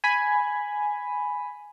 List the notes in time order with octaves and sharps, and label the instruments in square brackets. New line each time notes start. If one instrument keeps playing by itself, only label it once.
[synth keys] G#5 B5